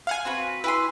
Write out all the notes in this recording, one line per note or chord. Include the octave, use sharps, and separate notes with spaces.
F5 F#5 G#5
C4 F#4 B4
E4 B4 G#5 C6